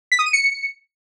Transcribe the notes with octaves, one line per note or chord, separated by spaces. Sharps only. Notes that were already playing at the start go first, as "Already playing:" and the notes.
B6
D#6
D#7
C#7